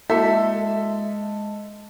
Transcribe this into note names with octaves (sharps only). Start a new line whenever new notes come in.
G#3 A#3 E4 F#4 A4 E5